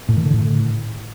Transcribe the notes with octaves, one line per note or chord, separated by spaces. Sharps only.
A2
D#3
D3
A2